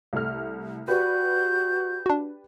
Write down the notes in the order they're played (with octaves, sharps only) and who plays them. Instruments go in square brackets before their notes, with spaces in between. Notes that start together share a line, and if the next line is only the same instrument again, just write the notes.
[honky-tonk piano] C2 A3 F6
[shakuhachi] F#4 [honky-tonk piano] G4 B4 D5 [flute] G6
[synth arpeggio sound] D4 F#4